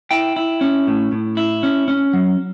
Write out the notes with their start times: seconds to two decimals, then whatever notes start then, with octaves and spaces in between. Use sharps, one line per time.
0.11 E4 G5
0.36 E4
0.61 C#4
0.87 A2
1.12 A2
1.37 E4
1.63 C#4
1.88 C#4
2.13 F#3